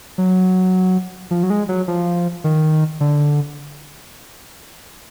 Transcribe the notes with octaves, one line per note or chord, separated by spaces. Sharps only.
F#3
F3
F#3
G#3
F#3
F3
D#3
D3